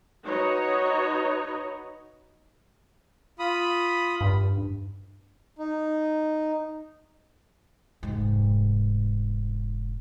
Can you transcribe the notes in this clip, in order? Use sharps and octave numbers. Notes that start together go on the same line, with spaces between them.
D#4 F#4 B4 C#5 D#5
F4 B5 D#6
G2
D#4
F1 G#2